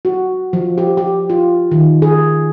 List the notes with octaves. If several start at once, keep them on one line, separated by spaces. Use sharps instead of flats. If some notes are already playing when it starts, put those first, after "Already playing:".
F#4
F3
G4
G4
F4
D#3
G#4